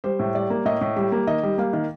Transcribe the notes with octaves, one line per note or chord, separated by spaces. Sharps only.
G3 C5
A2
G3 D5
A#3
A2 D#5
A2
G3
A#3
D#3 D#5
G3
A#3 F5
D#3